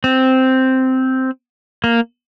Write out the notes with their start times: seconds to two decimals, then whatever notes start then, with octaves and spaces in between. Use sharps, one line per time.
0.04 C4
1.84 A#3